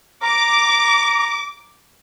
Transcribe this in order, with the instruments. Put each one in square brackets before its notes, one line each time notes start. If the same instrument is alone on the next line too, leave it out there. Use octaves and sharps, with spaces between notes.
[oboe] A#5 [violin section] D6